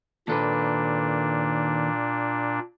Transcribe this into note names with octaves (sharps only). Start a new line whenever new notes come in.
D#2 A#2 D4 A4 B4